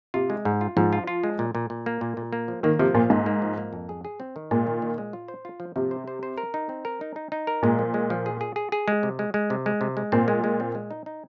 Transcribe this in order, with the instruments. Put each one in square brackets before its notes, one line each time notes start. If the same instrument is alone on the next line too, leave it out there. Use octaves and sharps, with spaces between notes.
[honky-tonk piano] C3 [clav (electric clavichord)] F4
[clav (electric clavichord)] G#3
G#2
F4
[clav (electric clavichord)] G#2 [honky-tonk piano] F3
[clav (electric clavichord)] F4
F4
G#3
A#2
A#2
A#2
A#3
A#2
A#2
A#3
F3
[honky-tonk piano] D#3 [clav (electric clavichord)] A#3
[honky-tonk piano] C3 [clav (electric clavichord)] F3
[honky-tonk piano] A#2 [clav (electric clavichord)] F4
[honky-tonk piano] G#2 [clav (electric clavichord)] A#3
[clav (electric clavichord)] A#3
F3
A#3
F2
G#4
G#4
C4
D#3
[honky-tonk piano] A#2 [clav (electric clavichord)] G#3
[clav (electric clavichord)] D#3
D#3
G#3
F4
C5
F4
F3
[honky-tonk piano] C3 [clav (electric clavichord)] F3
[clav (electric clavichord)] C5
C5
C5
A#4
D#4
C4
A#4
D#4
D#4
D#4
A#4
[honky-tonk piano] A#2 [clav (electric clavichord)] G#3
[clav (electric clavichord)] F3
G#3
F3
G#4
G#4
G#4
G#4
G#3
C3
G#3
G#3
C3
G#3
C3
G#3
[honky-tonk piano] A#2 [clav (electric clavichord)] C4
[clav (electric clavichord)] G#3
G#3
C4
G#3
D#4
D#4